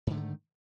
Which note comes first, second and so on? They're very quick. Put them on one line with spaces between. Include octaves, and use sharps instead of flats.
G#2 D3 A3 D#3